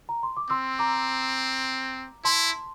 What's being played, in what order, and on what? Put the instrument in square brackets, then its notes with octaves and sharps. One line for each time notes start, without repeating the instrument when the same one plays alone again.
[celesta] A#5
C6
D6
[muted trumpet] C4 [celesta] C6 E6
[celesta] A#5 D6
[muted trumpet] E4 [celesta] A5 C6